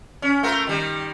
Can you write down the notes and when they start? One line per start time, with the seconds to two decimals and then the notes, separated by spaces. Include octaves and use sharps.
0.22 C#4
0.43 A3 F4 A#4
0.67 D#3 G3